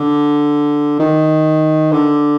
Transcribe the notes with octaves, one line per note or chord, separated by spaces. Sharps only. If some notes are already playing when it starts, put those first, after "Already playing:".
Already playing: D3
D#3
D3